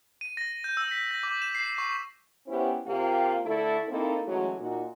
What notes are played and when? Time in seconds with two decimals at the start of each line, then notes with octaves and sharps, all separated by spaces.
0.21 D#7
0.37 A#6
0.64 G6
0.77 E6
0.91 B6
1.11 A#6
1.23 D6
1.42 E7
1.55 C7
1.78 C#6
2.48 B3 C#4 E4 G4 C5
2.87 C3 A#3 F4 G4
3.45 D3 A3 E4 A4
3.88 A#3 C4 D#4 E4 A4
4.27 E3 F#3 G#3 A3 C#4 F#4
4.59 A#2 D#4 F#4